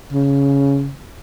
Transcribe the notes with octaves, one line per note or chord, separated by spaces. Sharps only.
C#3